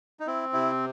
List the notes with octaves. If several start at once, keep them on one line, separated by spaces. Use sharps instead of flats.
D#4
C4 E4
C3 E4